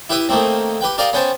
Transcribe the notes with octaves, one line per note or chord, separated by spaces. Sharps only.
E4 G4 B4 E5 D#6
D#3 A3 A#3 C4
G4 B4 G5
G4 A#4 D5 D#5 F5
B3 C#4 C5 G5 A5